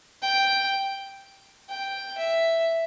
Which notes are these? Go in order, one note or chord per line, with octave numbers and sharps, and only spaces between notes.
G5
G5
E5